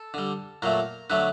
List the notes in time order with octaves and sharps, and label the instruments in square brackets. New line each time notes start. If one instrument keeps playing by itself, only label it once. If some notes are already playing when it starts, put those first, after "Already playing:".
Already playing: [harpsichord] A4
D3 G3
A#2 F#3 A3 A#4
D3 F#3 A3 B4